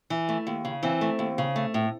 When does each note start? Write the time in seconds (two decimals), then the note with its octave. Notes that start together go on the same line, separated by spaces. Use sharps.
0.10 E3
0.29 A3
0.47 D#2
0.65 C#3
0.83 E3 C4
1.01 A3
1.19 D#2
1.38 C#3
1.56 A3
1.74 A2